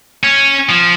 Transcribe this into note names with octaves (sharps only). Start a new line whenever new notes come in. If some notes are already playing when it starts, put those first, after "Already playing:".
C#4
F3